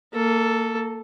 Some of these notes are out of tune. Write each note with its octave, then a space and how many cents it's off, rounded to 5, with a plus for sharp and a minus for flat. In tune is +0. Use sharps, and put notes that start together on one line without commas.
A#3 -25 A4 +0